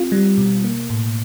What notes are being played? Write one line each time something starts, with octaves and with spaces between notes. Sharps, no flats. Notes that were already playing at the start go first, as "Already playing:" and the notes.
Already playing: C4 F4
G3
B2
A#3
A2